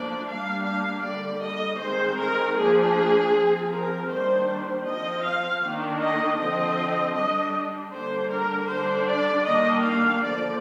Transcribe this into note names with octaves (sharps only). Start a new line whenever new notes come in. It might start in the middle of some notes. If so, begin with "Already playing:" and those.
Already playing: F3 A#3 D4 D5
G3 A#3 D4 F5
F5
D3 G3 A#3 D5
D#5
D#3 G#3 C4 C5
A#4
F3 A#3 D4 G#4
F3 C4
A#4
D#3 G3 A#3 D4 C5
C5
F3 C4 D#5
F5
D#3 A#3 D4
D#5
D3 F3 C4 D#5
G3 D4 D#5
D3 G3 A#3 D4 C5
A#4
D3 G3 D4 C5
D5
D#3 G3 A#3 D4 D#5
F5
D3 F3 A#3 D5